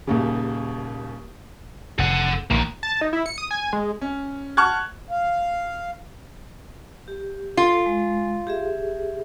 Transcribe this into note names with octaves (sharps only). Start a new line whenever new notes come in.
D#1 D#2 C#3
F1 A4 F#5
A#1 D#3 A#3
A5
D#4
E4
C#7
D#6
G#5
G#3
C#4
F#5 A5 C#6 F6 F#6 G#6
F5
G4
F4 A4
G#3
G4 G#4 E5